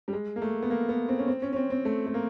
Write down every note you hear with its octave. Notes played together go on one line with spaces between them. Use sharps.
G3
G#3
A#3
A3
B3
A#3
B3
C4
C#4
C4
C#4
C#4
C4
C4
A3
A3
A#3